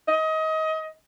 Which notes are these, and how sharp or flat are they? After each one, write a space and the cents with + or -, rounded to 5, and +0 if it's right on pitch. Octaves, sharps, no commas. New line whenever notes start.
D#5 +25